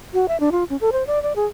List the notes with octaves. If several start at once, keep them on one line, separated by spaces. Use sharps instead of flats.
F#4
E5
D4
F4
C#4
A4
C5
D5
D5
G#4